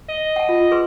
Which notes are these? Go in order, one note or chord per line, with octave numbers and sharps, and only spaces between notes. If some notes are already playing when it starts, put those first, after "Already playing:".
D#5
F#5 A5
F4
G#4 B4 C6